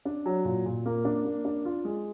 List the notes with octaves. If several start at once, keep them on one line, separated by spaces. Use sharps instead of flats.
D4
F#3
A#2
A#2
A#3
D4
A#3
D4
F4
G#3